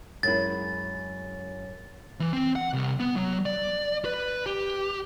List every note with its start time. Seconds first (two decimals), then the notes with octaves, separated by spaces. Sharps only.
0.23 F#2 G#3 E4 A6
2.20 E3
2.33 C4
2.56 F#5
2.73 C2
3.00 B3
3.16 F#3
3.46 D5
4.05 B4
4.46 G4